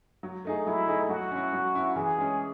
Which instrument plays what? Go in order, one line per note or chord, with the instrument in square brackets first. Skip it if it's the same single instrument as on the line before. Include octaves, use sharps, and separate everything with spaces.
[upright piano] F#3
A3 D#4 G#4
[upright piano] F#3 [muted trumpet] E4
[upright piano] A3 D#4 G#4
[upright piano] F#3 [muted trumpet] F#4
[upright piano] C#4 E4
F#3
C#4 E4
[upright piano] E3 [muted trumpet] G#4
[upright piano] G#3 C#4